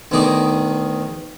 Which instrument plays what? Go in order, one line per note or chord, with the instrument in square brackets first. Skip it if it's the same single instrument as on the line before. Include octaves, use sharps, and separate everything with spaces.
[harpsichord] D2 B2 D#3 D#4 G#4 D6